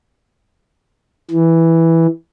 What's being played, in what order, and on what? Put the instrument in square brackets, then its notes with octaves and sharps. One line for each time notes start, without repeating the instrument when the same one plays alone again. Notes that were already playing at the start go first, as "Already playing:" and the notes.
[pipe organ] E3